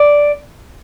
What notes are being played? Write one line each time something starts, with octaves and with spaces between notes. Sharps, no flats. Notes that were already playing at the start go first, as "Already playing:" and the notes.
Already playing: D5